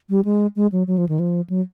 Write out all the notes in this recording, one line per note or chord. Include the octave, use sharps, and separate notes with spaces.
G3
G#3
G#3
F#3
F#3
F3
D#3
F3
F#3